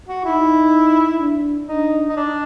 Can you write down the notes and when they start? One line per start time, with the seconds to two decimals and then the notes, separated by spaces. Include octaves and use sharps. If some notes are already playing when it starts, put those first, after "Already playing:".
0.09 F#4
0.25 D#4 E4
1.20 D4
1.68 D4 D#4
2.09 D#4
2.16 D4